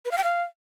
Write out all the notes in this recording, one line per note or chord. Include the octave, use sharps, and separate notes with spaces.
B4
F5
G5
F5